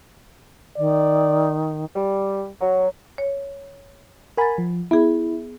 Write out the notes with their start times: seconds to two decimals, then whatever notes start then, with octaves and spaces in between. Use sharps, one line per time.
0.77 D#3 D5
1.96 G3
2.60 F#3
3.18 C#5
4.37 A#4 F#5 G#5 B5 A6
4.58 F3
4.91 B3 E4 G#4